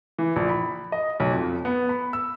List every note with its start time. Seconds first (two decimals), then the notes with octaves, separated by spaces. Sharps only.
0.18 E3
0.36 A#1
0.49 B5
0.92 D#5
1.20 B1
1.33 F2
1.65 B3
1.89 B5
2.13 E6